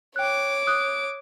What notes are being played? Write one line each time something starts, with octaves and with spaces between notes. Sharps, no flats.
C#5 G5 D6 F#6
D#6 F#6